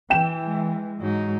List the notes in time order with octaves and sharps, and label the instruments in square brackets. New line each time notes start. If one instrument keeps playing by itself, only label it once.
[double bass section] E3 [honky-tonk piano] G5 E7
[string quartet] G#3
G#2 F#3 D#4